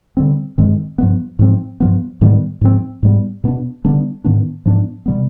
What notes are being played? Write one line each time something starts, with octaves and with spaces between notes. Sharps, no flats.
D3 G3 C4
G2 D#3 G#3 C4
G2 F3 G#3 B3
G#2 F3 C4
G2 F3 B3
G#2 D#3 G3 B3
G#2 F3 C4
G#2 G3 B3
B2 B3 D4
D3 G3 B3 D4
G#2 D#3 B3 D4
G#2 F3 B3 D4
C3 G3 B3